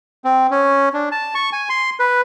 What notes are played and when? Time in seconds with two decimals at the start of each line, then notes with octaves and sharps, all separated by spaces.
0.24 C4
0.51 C#4
0.94 D4
1.12 A5
1.35 C#6
1.53 G#5
1.69 C6
1.99 B4